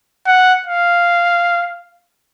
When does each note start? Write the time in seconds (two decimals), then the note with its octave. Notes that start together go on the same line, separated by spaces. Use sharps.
0.27 F#5
0.67 F5